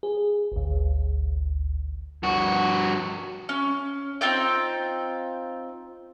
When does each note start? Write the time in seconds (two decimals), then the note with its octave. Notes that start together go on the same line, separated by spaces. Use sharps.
0.03 G#4
0.52 G#1 D2
2.23 G2 F#4
3.49 C#4
4.21 C4 D#4 F4 G5